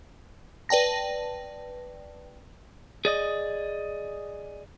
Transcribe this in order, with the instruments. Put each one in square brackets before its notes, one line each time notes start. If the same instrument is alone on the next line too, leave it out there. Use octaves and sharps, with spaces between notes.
[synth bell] B4 D5 G5 A5 A#6
[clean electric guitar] G#4 D5 D#5